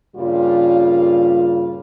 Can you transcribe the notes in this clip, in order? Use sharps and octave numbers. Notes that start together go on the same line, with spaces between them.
G2 A#2 C#3 G3 F4